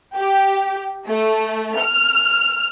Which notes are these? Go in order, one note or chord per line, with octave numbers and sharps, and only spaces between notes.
G4
A3
F6